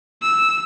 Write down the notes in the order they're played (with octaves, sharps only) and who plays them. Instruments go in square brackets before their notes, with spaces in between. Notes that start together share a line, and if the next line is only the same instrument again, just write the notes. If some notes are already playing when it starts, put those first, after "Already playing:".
[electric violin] E6